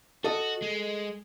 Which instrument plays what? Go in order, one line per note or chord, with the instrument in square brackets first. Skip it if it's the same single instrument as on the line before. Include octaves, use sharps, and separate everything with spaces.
[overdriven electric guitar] F#4 [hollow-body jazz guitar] A4 D#5
[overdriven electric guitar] G#3